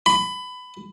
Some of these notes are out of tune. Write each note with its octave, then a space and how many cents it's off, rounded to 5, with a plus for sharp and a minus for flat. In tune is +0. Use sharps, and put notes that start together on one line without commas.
B5 +20